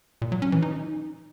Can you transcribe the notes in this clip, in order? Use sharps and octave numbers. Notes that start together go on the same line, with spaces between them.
A#2
F#3
C#4
E3
D#4